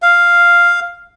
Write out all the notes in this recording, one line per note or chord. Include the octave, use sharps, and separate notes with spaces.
F5